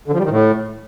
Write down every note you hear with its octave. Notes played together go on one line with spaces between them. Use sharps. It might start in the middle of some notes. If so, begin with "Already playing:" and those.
D3
F3
G3
D#3
A2